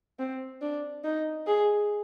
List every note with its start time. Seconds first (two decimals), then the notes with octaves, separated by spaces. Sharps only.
0.19 C4
0.62 D4
1.04 D#4
1.47 G#4